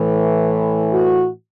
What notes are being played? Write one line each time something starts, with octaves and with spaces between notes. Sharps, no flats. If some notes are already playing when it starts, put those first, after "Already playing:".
Already playing: A2 E3
F#4